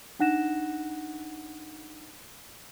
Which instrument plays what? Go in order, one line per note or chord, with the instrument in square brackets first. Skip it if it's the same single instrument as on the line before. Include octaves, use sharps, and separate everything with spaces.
[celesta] D4 D#4 F#5 F#6 A#6 E7